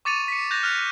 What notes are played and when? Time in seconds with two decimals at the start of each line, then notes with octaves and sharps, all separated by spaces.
0.05 C#6 D6 A6 C#7 D#7 F7
0.28 B6 C#7
0.51 F#6 G6 A#6 F7
0.63 F6 F#6 F7